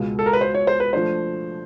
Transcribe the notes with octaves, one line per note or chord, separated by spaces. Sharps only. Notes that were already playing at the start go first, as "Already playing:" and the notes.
Already playing: C#2 B2 G#3
A4
A#4
B4
C5
C#5
C5
B4
F3 A3 D4 C5